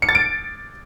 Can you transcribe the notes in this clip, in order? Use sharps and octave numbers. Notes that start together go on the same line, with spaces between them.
C#7
A6
D7